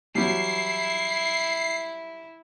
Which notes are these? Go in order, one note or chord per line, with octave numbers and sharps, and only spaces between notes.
E3 F#3 G3 E4 C7